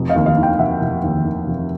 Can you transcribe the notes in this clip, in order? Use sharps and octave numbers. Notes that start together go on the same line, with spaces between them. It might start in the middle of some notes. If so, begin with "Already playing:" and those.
Already playing: F1
D#5 F5
D#2
D#5 F5
D#3
F5 G5
F1 E5 F#5
F1
D#2
D#3
F1